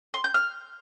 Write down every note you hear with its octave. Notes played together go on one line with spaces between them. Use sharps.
C6
G6
F6